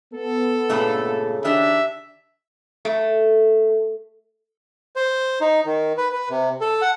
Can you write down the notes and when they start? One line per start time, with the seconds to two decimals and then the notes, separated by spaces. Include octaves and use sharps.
0.13 B3 A4
0.70 G2 A#2 C#3 A3
1.45 D#3 D4 G4 E5
2.85 A3
4.96 C5
5.41 D#4
5.66 D#3
5.98 B4
6.12 B4
6.30 C3
6.61 A4
6.82 F#5